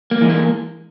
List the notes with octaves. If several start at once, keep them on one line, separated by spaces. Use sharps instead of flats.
A#3
E3 G#3
A#3